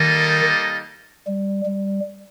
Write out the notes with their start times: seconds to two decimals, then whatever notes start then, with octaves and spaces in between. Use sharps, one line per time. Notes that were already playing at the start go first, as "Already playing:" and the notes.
Already playing: D#3 G3 A#3 D#4 A4 D#5
1.27 G3
1.65 G3